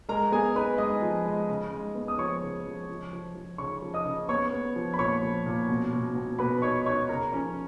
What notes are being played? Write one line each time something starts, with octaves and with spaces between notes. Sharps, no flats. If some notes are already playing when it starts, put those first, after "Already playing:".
G#3 A#4 A#5
B3 G#4 G#5
D#4 B4 B5
G#3 D#5 D#6
F3
G#3
C#3
G#3
B3
D#6
F3 C#5 C#6
C#3
F3
F3
F3
F3
C#3 C#5 C#6
F3
D#5 D#6
C#3
B3 C#5 C#6
B3
F3
B5
A#2 C#5 C#6
F3
A#2
B2
B2
B2
B2 B4 B5
D#4 C#5 C#6
D#4 C#5 C#6
C#3 A#4 A#5
F3 C#4 C#5